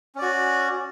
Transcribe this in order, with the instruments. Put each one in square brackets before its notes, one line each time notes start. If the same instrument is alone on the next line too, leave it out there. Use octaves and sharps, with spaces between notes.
[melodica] C#4
D5
F#4